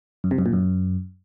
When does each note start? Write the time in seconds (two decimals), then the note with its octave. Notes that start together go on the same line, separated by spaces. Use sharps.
0.24 F#2
0.31 C3
0.38 F#2
0.46 A#2
0.53 F#2